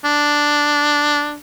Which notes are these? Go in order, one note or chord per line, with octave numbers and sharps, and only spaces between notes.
D4